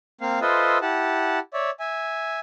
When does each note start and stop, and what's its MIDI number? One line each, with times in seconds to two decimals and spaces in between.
0.21 0.39 58
0.21 0.39 60
0.21 0.39 77
0.42 0.78 65
0.42 0.78 69
0.42 0.78 71
0.42 0.78 72
0.42 0.78 75
0.42 0.78 76
0.82 1.39 64
0.82 1.39 67
0.82 1.39 78
0.82 1.39 81
1.53 1.70 73
1.53 1.70 74
1.53 1.70 76
1.80 2.40 76
1.80 2.40 80